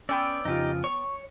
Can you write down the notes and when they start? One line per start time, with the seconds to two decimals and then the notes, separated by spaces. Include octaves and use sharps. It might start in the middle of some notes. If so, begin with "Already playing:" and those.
0.09 B3 C#4 D5 G5 E6
0.45 F2 C#3 D#4 F4 G4
0.84 C#5 C#6